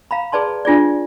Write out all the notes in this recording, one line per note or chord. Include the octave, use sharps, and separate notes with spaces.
F5 A#5 B5
G#4 B4 D5 A5 C6
D4 F4 G#4 D5